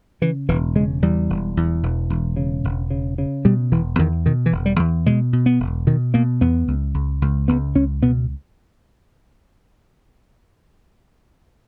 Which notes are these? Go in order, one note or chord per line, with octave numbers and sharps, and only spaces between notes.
C#3 E3
E1 E3
C#3 G#3
E2 G3
E1
E2
E1
E1
C#3
E1
C#3
C#3
B2 G3
E1 E3
E2 D#3
B2 D#3
E3
E1
G3
E2
B2 G#3
B2
B3
E1
B2 D#3
B2 A#3
E2 B3
C#2
C#2
C#2
C#2 B3
C#2 C#4
B2 B3